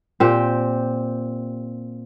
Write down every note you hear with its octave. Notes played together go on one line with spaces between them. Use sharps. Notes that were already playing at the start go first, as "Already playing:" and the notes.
A#2 C4 G4